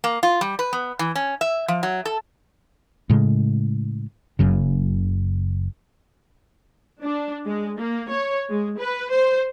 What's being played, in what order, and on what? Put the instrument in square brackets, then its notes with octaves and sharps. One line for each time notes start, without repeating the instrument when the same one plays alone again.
[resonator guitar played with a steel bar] A#3
F4
G3
B4
B3
E3
C#4
E5
F3
F#3
A4
[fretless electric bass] A2 C#3 G#3
F#1 F#2 C#3
[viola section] D4
G#3
A#3
C#5
G#3
B4
C5